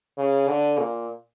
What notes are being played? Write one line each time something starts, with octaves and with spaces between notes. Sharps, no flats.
C#3
D3
A#2